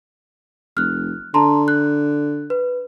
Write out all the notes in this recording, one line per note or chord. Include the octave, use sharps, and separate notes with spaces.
F1 F6 F#6
D3 A5 A#5 C6
F#6
B4